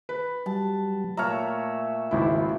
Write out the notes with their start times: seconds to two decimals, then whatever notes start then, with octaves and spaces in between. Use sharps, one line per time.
0.09 B4
0.46 F#3 G3 A5
1.17 A#2 A3 C#5 E5 A#5 F6
2.11 G#1 C#2 E4